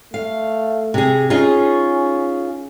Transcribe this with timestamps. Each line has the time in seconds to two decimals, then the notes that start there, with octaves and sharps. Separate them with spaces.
0.14 A3 F5
0.94 C3 G#4
1.30 C#4 D#4 F4 G#4